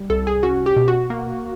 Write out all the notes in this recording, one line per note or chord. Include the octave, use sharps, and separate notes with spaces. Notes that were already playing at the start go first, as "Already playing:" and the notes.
Already playing: G3
C2 A4
G#4
C#4 F#4
G4
B2
F#4
A#3